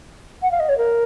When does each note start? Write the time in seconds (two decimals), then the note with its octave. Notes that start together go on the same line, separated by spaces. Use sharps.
0.42 F#5
0.51 F5
0.59 D#5
0.69 C#5
0.78 A#4